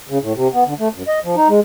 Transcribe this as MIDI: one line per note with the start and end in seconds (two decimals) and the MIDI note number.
0.09 0.18 49
0.21 0.33 45
0.36 0.48 48
0.53 0.64 59
0.66 0.74 50
0.79 0.88 57
0.94 1.03 42
1.08 1.19 75
1.24 1.35 53
1.36 1.48 63
1.48 1.60 56